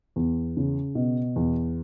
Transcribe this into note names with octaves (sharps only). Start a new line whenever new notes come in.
E2
C#3
B2
E2